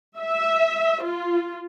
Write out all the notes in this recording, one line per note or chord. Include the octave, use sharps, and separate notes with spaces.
E5
F4